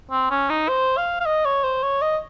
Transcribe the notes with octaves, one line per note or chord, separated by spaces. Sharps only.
C4
C#4
D#4
C5
F5
F5
D#5
C#5
C5
C#5
D#5